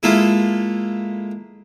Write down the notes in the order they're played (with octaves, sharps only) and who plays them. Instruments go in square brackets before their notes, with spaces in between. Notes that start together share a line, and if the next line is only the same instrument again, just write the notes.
[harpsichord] G#3 A#3 E4 F4 A4